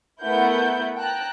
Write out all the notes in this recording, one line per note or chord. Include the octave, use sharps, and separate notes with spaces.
A3 B3 E4 A#4 F#5 G6
G5 A5 A#5 F#6